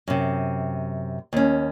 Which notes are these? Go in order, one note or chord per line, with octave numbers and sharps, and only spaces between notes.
F#2 C3
D#2 C#4